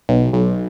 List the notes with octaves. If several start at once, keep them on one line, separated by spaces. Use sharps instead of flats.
B1
B1